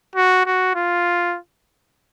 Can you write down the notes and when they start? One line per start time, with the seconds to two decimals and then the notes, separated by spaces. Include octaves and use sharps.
0.16 F#4
0.46 F#4
0.75 F4